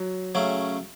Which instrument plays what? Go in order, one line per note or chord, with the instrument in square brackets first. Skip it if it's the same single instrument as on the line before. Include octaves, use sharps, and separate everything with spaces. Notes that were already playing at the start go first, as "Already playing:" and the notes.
Already playing: [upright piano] F#3
[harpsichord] C#3 F#3 A3 C#4